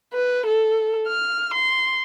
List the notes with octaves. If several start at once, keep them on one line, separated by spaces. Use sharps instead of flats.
B4
A4
F6
C6